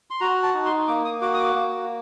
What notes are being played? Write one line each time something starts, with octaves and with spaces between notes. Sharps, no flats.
C6
F#4 A#5
A5
D#4
C6
A#3 D6
D#6
F#4 D6
D#6
D6
A#3